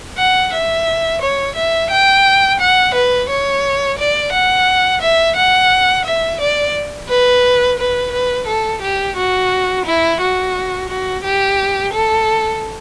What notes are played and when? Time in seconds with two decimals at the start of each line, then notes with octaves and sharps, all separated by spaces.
0.17 F#5
0.53 E5
1.21 C#5
1.55 E5
1.90 G5
2.59 F#5
2.94 B4
3.29 C#5
3.98 D5
4.32 F#5
5.01 E5
5.36 F#5
6.05 E5
6.40 D5
7.09 B4
7.79 B4
8.12 B4
8.47 A4
8.81 G4
9.16 F#4
9.85 E4
10.20 F#4
10.89 F#4
11.23 G4
11.93 A4